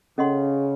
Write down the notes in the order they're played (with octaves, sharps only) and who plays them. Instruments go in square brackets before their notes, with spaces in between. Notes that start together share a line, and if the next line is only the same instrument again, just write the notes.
[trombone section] C#3 [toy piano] C#4 A4 D#5 F#5 C6